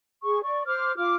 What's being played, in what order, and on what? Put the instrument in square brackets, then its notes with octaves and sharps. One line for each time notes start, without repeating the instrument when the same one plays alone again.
[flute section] G#4 C#6
D5 C#6
C5 D6 F6
F4 D6 F6